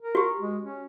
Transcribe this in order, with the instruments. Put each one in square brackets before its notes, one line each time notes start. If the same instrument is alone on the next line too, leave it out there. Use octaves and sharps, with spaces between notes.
[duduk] A#4
[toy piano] F#4 G4
[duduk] G#3
C#4